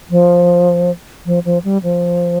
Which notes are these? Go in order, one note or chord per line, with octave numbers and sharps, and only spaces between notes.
F3
F3
F3
G3
F3